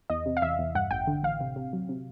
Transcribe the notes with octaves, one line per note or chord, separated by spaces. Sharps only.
E2 D#5
C3
F5
E2 E5
E2
G2 F#5
A1 G5
D3
A1 F5
C3
C3
F#3
C3